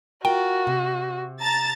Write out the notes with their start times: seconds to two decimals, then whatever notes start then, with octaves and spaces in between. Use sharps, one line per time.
0.25 F4 F#4 A#4 G5
0.67 C3
1.40 A5 A#5 A6